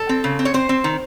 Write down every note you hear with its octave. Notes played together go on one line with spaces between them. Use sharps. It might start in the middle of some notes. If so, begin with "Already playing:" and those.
Already playing: A4
C4
C#3
C4
C#5
C4 C5
C4
D#3